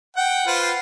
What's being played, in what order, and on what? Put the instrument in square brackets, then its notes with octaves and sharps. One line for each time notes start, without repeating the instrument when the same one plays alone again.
[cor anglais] F#5 [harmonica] G5
[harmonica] F4 B4 C5